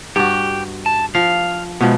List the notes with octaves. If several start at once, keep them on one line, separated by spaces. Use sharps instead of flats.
G2 F#4 G4
A5
F3 F5
B2 F3 G#3 B3